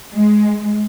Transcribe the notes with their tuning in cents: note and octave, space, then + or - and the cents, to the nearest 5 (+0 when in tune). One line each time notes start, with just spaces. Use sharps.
G#3 +15